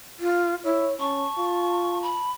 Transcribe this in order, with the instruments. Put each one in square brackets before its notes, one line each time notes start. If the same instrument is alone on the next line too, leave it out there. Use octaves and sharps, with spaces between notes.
[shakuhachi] F4
[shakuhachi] E4 [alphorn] C#5
[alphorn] C#4 [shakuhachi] A5 [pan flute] C#6
[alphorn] F4
[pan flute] B5